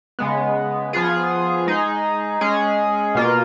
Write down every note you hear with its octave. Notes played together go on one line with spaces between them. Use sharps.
C#3 G#3 B3
F3 B3 F4 G#4
G#3 D#4 G#4
G#3 C#4 G#4
B2 A#3 F4